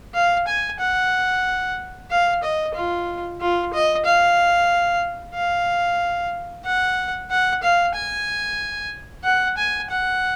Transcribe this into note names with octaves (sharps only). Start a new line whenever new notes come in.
F5
G#5
F#5
F5
D#5
F4
F4
D#5
F5
F5
F#5
F#5
F5
G#5
F#5
G#5
F#5